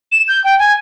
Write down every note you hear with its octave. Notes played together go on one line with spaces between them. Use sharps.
E7
G6
G5
G#5